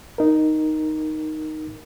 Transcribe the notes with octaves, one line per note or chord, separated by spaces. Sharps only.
D#4 A#4